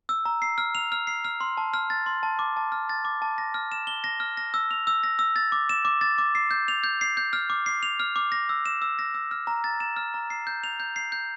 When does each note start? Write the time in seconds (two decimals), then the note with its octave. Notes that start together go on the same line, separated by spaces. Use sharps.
0.09 E6
0.25 A#5
0.42 C7
0.58 F6
0.75 F7
0.92 F6
1.07 C7
1.25 F6
1.41 C6
1.57 A5
1.74 F6
1.90 A6
2.06 C6
2.23 A5
2.39 D6
2.57 A5
2.72 F6
2.89 A6
3.05 D6
3.22 A5
3.38 A#6
3.54 F6
3.72 E7
3.87 G7
4.04 A#6
4.20 F6
4.37 A#6
4.54 E6
4.71 F7
4.87 E6
5.04 A#6
5.19 E6
5.36 A6
5.52 D6
5.69 E7
5.85 D6
6.01 A6
6.18 D6
6.35 C7
6.51 G6
6.68 F7
6.84 G6
7.01 C7
7.17 G6
7.33 F6
7.50 D6
7.66 C7
7.83 F7
8.00 F6
8.16 D6
8.32 A#6
8.49 E6
8.66 E7
8.82 E6
8.99 A#6
9.14 E6
9.31 F6
9.47 A#5
9.64 A6
9.80 E7
9.96 F6
10.14 A#5
10.30 C7
10.47 G6
10.64 F7
10.80 G6
10.96 C7
11.12 G6